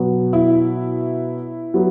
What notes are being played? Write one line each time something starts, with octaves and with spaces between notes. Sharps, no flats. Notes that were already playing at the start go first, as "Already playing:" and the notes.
Already playing: B2 F#3 B3
E4
F#3 B3